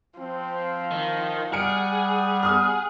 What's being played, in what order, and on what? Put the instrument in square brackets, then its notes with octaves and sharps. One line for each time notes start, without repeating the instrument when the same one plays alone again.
[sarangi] F3 [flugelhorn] C4
[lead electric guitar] D#3
[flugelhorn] G3 [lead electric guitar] G#4 [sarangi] F#5 [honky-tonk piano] F6 C#7 D7
[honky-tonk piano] D#6 F6